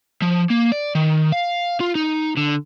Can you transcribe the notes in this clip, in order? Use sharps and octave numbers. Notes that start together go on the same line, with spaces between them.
F3
A#3
D5
D#3
F5
F4
D#4
D3